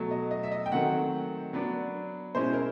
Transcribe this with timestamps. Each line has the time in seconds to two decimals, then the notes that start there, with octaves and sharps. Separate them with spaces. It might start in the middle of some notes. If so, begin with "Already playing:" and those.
Already playing: B2 F#3 A3
0.11 D#5
0.31 D#5
0.43 E5
0.52 D#5
0.66 G5
0.72 D#3 F#3 A3 C4 F#5
1.53 F#3 B3 D4
2.35 B2 G#3 C#4 E4 C5
2.53 A#4